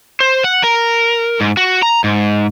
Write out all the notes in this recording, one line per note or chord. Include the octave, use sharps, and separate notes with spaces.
C5
F#5
A#4
G#2
F#4
A#5
G#2